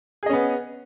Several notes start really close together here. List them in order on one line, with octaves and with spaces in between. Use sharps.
G#4 D#5 C#4 B3